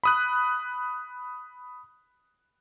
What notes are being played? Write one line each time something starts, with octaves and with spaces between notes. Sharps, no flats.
B5 D#6 F#6